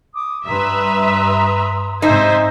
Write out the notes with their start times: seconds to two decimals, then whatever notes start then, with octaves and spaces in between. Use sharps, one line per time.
0.14 D6 D#6
0.47 G2 B4 E5 A#5 C6 D#6
2.02 G#2 C3 D#4 C5 E5 G#5